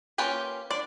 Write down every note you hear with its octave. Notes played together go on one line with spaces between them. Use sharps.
A#3 C#4 F4 G4 B4
D4 D5